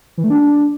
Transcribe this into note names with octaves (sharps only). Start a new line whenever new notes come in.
E3
A3
D4